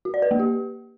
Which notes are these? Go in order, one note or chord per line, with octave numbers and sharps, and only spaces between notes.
F#4
D5
B4
A#3
G4